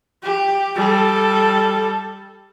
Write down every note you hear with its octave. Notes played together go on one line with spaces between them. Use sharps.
G4
G3 A4